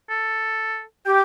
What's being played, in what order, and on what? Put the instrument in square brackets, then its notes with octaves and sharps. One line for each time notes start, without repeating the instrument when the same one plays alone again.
[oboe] A4
[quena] G4 [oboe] G5